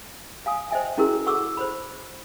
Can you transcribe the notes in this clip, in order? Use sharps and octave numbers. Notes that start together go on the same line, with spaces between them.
F5 G#5 D#6
C5 C#5 D#5 E5 G5 G#5
C#4 E4 F#4 G#4 A#4 B4
A4 F#5 C#6 D6 E6
C5 C#5 B5